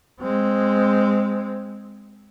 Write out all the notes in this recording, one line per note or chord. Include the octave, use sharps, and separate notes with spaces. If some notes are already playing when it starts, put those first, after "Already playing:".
G#3 C4